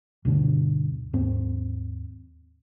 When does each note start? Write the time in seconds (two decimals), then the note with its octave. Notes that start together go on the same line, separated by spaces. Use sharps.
0.25 D2 G2 B2 D3
1.13 D#2 G#2 C4